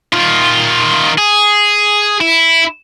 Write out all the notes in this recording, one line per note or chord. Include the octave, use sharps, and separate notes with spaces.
D#3 F4
G#4
E4